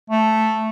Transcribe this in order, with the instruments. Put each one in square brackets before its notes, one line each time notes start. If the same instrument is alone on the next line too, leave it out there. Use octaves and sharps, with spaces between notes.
[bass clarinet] A3